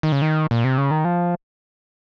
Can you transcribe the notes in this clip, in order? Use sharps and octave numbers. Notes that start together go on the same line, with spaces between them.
D#3
C#3
D#3
A#2
C3
C#3
D#3
F3